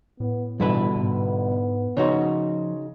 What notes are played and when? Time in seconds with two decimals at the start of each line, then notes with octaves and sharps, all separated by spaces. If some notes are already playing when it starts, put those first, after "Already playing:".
0.20 A2 B3
0.60 G1 B2 D3 E3 E4 B4
0.96 G#2 B3
1.97 C#3 F3 D#4 F#4 C#5 C6